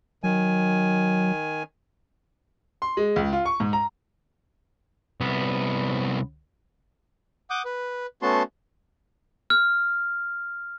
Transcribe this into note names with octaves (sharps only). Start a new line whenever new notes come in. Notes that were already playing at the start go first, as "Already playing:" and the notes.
D#3 F#3 G#5
C6
G#3
C#2
F4
C#6
G#2
A#5
C2 B3
F#5 D6 D#6 G6
B4
A3 B3 C#4 F#4 A5 C6
F6